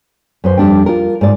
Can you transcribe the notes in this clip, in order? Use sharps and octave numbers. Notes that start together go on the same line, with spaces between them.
F#2 B4 C5
F2 G3 D4 G5
F4 A#4
G#2 D5